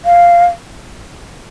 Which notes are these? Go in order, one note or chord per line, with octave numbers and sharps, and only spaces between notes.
F5